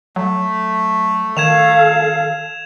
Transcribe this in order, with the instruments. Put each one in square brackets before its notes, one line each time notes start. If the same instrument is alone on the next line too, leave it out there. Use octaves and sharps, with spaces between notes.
[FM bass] F#3 [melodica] A3
[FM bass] D#3 [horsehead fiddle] A4 F5 [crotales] G#6 E7 F7